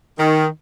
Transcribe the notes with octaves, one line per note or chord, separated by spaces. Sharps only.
D#3